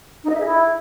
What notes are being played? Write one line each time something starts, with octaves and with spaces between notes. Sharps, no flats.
D#4
D#5
E5
G#4
E4